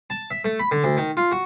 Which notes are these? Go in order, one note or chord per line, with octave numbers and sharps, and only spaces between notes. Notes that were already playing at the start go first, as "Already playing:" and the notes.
A5
E5
A3
B5
D3
D2
D#3
F4
F#4